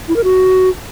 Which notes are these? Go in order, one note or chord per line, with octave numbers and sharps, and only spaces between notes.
E4
A#4
F#4